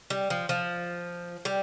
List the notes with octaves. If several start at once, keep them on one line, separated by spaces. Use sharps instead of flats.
G3
F3
F3
G3